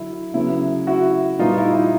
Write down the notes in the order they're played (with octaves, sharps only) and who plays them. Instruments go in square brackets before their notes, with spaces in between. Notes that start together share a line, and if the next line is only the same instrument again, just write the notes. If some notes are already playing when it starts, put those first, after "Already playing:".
Already playing: [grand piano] D3 F#3 E4
C#3 F#3 B3 E4
E4 F#4
A#2 G3 B3 D#4 F4
E4
D#4